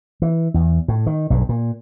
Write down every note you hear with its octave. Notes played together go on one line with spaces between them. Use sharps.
E3
E2
A2
D#3
B1 G2
A#2